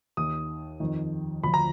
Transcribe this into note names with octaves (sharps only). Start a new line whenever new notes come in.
D#2 D#3 D#6
F2 D#3
D2 D3 F3 B5
A#5